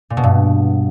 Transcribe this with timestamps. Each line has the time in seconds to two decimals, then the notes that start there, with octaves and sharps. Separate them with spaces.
0.10 A#2
0.17 B2
0.24 G2